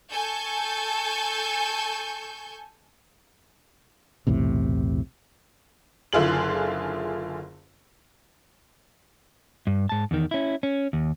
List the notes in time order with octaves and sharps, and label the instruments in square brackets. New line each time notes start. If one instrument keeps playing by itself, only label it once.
[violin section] A4 G#5 C#6 G6
[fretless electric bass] B1 E2 A2 C3
[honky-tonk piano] F#1 D3 E4 F4 G#4 F#7
[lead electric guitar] G2
G#2 A5
E2 D#3
C#4 E4
C#4
D#2